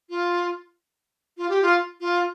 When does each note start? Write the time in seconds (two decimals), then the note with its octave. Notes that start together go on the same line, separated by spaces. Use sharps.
0.09 F4
1.37 F4
1.49 G4
1.62 F4
2.00 F4